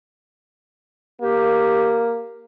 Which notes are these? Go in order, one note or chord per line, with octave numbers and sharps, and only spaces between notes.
A#3 G4